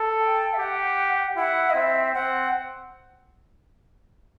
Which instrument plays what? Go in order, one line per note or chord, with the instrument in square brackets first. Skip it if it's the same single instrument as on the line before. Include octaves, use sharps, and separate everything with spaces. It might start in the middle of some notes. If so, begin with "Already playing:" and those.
Already playing: [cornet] A4
[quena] G5
E5
[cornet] G4 [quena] F#5
[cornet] E4 [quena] F#5
[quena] D#5
[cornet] C4 [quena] E5
[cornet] C4 [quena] F#5